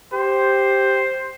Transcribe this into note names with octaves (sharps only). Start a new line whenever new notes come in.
G4 C5